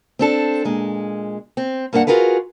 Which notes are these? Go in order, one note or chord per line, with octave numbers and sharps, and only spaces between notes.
C4 D4 A4
A#2 G#3
C4
G2 A#3 D4 B4 F#5
F4 F#4 G#4 A#4 B4